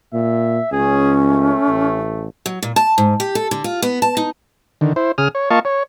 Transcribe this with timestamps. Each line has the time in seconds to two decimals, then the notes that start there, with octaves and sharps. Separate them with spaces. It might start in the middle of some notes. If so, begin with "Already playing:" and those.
0.13 A#2 E5
0.72 C#2 C#4 G#4
1.30 A3
1.67 A1
2.46 F#3
2.63 A#2
2.76 A5
2.98 G#2
3.20 G4
3.35 A4
3.51 D3
3.64 F4
3.82 B3
4.02 A5
4.17 D#4
4.81 D3 D#3
4.96 E4 C5
5.18 C#3 G#4 D#6 F6
5.35 C#5
5.50 A#3 F4 D#5 F5 A5 C#6
5.65 C#5